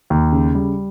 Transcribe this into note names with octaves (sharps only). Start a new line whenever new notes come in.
D#2
C#3
G3